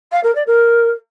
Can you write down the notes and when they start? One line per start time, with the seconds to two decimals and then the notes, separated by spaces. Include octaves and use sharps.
0.12 F5
0.23 A#4
0.35 D5
0.47 A#4